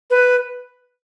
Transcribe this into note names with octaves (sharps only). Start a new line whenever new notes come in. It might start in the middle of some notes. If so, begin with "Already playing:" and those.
B4